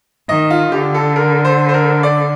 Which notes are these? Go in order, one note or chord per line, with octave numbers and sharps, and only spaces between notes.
D#3 D#5
F4
D3 G4
A4
A#4
C5
C5
A#4
D5